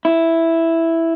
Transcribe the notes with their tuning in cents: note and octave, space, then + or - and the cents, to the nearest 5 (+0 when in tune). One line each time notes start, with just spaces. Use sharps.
E4 +0